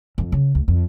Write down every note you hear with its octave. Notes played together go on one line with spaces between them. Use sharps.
F2
C#3
D2
F2